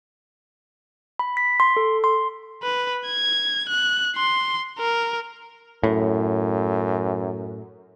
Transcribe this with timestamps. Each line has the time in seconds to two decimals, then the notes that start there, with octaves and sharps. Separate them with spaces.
1.19 B5
1.37 B6
1.60 C6
1.77 A4
2.04 C6
2.62 B4
3.07 G#6
3.69 F#6
4.16 C6
4.79 A#4
5.84 F#2 A2